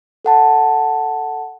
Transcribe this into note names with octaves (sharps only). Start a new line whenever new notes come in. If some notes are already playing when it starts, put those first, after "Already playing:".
A4 F#5 A5